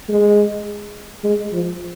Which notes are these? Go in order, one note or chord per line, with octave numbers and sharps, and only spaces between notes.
G#3
G#3
F3